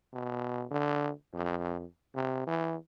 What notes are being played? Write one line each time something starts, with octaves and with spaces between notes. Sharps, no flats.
B2
D3
F2
C3
E3